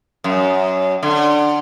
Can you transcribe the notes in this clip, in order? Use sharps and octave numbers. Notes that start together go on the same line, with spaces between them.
F#2
D3